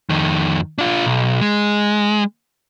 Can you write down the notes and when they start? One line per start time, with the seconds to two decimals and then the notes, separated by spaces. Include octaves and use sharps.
0.10 F2 D#3
0.78 D4 F4
1.05 B1
1.41 G#3